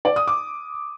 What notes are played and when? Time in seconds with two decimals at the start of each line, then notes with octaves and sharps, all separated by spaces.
0.05 D5
0.16 D#6
0.27 D6